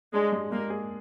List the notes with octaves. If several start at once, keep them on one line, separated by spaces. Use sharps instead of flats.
G#3 D4
G#3
G#3 A#3
G#4